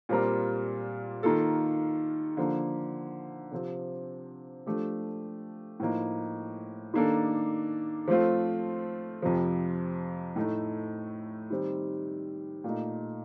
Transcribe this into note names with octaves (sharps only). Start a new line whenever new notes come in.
A#2 G3 C4 F4 A#4
D#3 A#3 F4 A4
D3 F3 A#3
C3 F3 C4
F3 A3 D4 G4
A2 F3 A#3 D#4
D#3 A#3 D4 A4
F3 A3 C4 F4
F2 C3 F3
A2 A3 D#4
D#3 G3 C4
A#2 A3 D#4